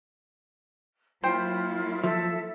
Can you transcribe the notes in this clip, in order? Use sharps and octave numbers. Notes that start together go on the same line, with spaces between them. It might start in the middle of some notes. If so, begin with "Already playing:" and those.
F#3 A#3 E4 F4 C5 G5
F3 A4 E5